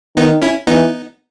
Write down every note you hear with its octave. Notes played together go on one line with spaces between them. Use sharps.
D#3 B3 D#4
C#4 E4
E3 B3 D#4